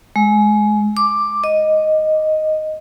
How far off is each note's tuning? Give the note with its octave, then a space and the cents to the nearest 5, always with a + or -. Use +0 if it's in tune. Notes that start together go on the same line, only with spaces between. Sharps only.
G#3 +20
D6 +5
D#5 +0